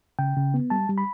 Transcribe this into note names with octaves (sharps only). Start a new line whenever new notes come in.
C#3 G5
C#3
B3
G3 A5
G3
B5